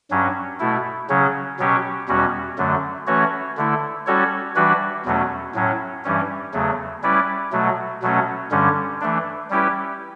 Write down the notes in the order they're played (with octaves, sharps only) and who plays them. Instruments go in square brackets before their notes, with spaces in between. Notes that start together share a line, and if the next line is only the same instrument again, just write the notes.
[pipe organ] G2 F#3 C#4
B2 A3 E4
C#3 F#3 C#4
B2 F#3 C#4 G4 C#5
E2 B2 G3 C#4 F#4
F#2 D3 F#3 A3
E3 A3 C#4 F#4 C#5
D3 A3 E4
G3 C#4 F#4 A4 C#5
E3 G3 D4 F#4 B4
E2 B2 F#3 A3 C#4
A2 F#3 C#4
G2 E3 G3 C#4
E2 C#3 F#3 A3
G3 C#4 E4 B4 D5
B2 F#3 A3
B2 F#3 A3 C#4
G2 D3 G3 C#4
E3 A3 D4
G3 C#4 E4 G4 B4